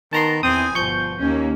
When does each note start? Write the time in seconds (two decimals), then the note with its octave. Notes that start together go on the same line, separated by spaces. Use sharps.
0.13 D#3 B3 A5 A#5 C6
0.43 E2 E3 C4 G#5 D#6
0.75 G1 B2 F3 C#6 G6
1.20 D#2 A#3 C#4